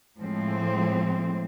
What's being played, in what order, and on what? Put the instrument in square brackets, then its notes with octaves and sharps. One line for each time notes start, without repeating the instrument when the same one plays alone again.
[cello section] A2 F3 G#3 C4